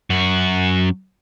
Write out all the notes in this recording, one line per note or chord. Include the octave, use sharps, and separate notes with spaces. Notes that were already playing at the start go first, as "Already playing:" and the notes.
F#2 F#4